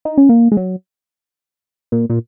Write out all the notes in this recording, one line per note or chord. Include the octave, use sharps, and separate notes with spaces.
D#4
C#4
A#3
G#3
F#3
A#2
A#2